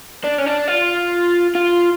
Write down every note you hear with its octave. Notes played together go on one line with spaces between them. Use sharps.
D4
C#4
D4
F4
F4